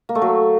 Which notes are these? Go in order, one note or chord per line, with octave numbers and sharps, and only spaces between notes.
A#3
A3
F#3